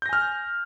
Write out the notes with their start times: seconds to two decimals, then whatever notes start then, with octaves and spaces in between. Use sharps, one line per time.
0.02 G6
0.06 A#6
0.09 G#5
0.13 F6